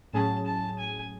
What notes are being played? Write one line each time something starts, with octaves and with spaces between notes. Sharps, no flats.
A2 F#3 C#4 G#4 A5
A5
G#5